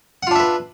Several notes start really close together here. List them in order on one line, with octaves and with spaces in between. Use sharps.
F#5 F4 D4 E5 B4